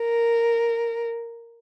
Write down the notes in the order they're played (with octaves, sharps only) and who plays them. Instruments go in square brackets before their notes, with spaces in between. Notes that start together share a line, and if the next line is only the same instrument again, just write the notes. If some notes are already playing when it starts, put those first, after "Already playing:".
Already playing: [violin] A#4